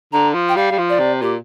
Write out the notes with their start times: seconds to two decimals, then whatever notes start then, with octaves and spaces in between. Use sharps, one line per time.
0.13 D3 A#5
0.34 F3
0.49 G5
0.56 G3 F5
0.72 G3
0.78 F3
0.89 D5
0.99 C3
1.22 A#2 G4